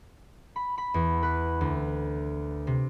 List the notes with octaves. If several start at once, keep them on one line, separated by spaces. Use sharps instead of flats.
B5
B5
E2
B4
D2
C3